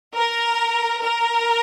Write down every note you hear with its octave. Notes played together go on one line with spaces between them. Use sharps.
A#4
A#4